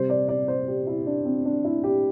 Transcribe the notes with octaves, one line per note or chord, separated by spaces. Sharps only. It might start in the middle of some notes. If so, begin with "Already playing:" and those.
Already playing: C3 G3 C5
D5
D5
C5
G4
E4
D4
C4
D4
E4
G4